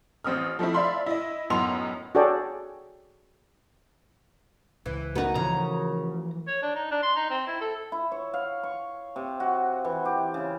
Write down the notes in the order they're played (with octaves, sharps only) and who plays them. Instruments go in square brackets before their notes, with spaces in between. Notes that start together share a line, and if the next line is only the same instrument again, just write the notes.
[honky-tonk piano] A1 C4 D#6 F6
F3 A3 C4 E4
D5 E5 F5 B5 C6
E4 D#5
F#2 A2 B3 D#4 C6 F7
[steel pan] F#4 G#4 A4 C#5 D5 G5
[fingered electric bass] C#2 [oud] E3
[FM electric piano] A3 F#4 A#4 [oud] B3 D#4
[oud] C#3 [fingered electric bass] E3 F3 [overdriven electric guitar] A#5
[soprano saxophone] C#5
D4
D#4
D4
C6
D#4
C4
E4
A4
[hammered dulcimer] E4
C#5
F5
C#6
C3
F#4
E3
G4
C#3